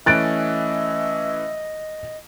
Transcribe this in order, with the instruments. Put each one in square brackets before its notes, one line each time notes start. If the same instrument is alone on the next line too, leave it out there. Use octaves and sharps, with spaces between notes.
[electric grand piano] E3 A3 C#4 [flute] D#5 [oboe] E5 [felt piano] F#6 A6 D7